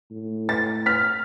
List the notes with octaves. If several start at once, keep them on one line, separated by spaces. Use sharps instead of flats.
A2
A6
F6 B6